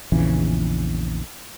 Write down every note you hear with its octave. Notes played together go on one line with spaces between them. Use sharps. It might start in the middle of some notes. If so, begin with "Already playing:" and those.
A#1 E2 C#3 E3